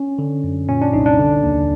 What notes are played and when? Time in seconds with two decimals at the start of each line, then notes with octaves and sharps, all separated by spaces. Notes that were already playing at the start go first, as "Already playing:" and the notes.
Already playing: C#4
0.19 D3
0.44 F#2
0.69 A#2 C#4
0.82 D4
0.93 C2 D#4
1.06 D4
1.19 D3
1.43 D#2